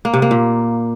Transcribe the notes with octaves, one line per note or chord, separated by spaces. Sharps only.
A#3
C3
A#3
A#2